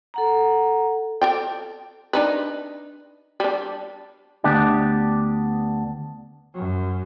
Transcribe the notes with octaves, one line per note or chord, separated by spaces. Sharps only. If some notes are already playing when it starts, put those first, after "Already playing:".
A4 F#5 A#5
A4 D5 G5
D4 D#4 B4
G3 D4
D2 B3 D4 G4
F#2